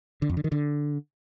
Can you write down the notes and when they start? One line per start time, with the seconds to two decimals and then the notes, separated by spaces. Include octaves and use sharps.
0.22 D3
0.29 F2
0.37 D3
0.44 D#3
0.52 D3